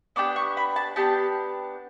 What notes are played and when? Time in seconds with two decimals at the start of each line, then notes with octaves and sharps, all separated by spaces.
0.16 B3 D4 G4 D6
0.36 C#6
0.57 B5
0.76 A5
0.96 B3 D4 G4 A5